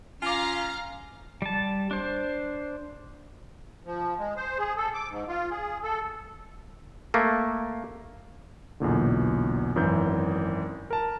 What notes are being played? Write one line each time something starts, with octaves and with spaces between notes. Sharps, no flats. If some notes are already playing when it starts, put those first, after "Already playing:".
C#4 F4 F5 G#5 A#5 D6 F6
G3 A5
D4 C5
F3
G#3
C5
G#4
A4
D6
G#2
F4
G#4
A4
A3 A#3
B1 E2 A#2 D3
G#1 F#2 E3 G6
A#4 A5